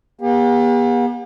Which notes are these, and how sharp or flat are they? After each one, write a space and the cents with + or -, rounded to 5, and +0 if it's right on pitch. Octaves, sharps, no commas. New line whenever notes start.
B3 -45 G4 +45